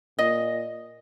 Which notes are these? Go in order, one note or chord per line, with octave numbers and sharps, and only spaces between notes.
A#2 D#5